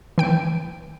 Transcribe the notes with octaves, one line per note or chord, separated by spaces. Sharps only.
E3 G5 D7